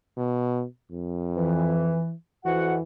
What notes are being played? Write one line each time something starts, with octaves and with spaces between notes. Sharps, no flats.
B2
F2
E3
F2 E3 F#4 F#5